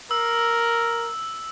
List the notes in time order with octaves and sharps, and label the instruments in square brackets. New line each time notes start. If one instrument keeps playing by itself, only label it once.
[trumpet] A#4 [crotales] E6